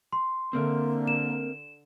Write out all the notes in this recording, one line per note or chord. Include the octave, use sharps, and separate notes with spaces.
C6
D3 A#3 C4 A#4 E5
E7